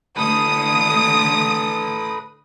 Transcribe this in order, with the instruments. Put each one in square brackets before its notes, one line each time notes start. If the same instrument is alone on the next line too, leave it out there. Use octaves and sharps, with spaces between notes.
[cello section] D3 A3 [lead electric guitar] A4 B4 [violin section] D#6